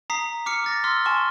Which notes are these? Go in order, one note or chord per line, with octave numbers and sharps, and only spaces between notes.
A#5 D#6 B6 C7
D6 F6 C7 C#7
D6 A6 A#6
C6 D6 E6 F6 B6
G#5 A5 C6 C#6 F6